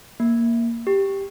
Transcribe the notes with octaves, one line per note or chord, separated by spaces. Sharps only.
A#3
G4